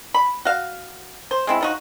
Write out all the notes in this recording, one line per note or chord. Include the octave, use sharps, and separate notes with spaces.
B5
F#4 F5
C5
G#3 C4 E4
F3 D#4 F#4